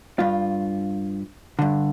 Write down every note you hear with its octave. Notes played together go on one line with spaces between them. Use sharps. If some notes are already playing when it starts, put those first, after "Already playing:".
G2 F4
G2 D3